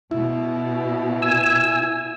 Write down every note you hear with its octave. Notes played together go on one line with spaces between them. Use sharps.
B2 E4
G#5 E6